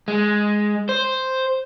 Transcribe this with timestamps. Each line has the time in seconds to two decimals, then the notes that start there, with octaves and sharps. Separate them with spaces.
0.08 G#3
0.89 C5